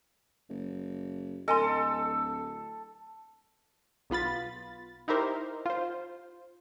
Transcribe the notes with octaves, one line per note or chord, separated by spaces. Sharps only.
F#1
D1 A4 D#5 G#5 C6
B1 B3 F4 B5 A6
D#4 E4 G4 A#4 C5
F4 C5